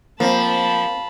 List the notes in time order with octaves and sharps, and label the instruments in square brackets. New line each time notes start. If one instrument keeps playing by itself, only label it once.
[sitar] F3 [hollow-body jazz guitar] A#3 C4 [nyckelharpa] A5 B5